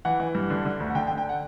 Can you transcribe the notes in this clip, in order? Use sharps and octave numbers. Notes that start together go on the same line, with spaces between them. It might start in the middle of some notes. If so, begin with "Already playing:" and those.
E3 F#5
E3
G2
D3
D3
D2
F#5
D3 G5
G5
D3
G5
F#5